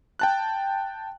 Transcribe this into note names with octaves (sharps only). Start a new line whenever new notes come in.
G5 A5 F#6